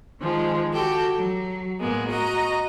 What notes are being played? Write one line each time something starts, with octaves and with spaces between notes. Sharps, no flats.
D#3 F3 G#3
F#4 G4 A4 G5
F#3
A2 G#3 A#3 B3
F#4 D#5 A#5